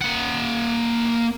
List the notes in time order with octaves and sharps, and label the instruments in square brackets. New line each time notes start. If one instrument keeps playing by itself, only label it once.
[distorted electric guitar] A#3 F#5